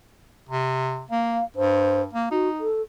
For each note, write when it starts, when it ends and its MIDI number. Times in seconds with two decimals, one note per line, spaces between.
0.49 1.03 48
1.10 1.41 58
1.10 1.44 77
1.56 2.06 43
1.56 2.02 72
2.13 2.28 58
2.31 2.68 63
2.31 2.49 66
2.60 2.82 69